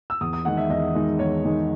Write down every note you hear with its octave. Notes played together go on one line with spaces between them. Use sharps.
E6
E2 D#6
D#6
D#3 G#3 D#4 F#5
E5
E2 D#5
D#3 G#3 D#4
E2 C#5
D#3 G#3 D#4